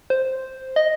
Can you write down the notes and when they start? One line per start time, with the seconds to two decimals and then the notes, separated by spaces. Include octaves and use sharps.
0.10 C5
0.76 D#5